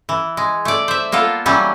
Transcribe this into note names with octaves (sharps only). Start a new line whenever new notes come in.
E3
G#3
A3 D5
C5 E5
A#3 B3 F4 A4
E3 F#3 G3 C#4